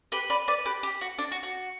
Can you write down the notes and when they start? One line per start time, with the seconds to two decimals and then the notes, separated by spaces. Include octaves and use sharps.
0.12 G4 B4
0.30 B4 D5
0.48 B4 D5
0.66 G4 B4
0.83 G4
1.01 F#4
1.18 D4
1.31 F#4
1.43 F#4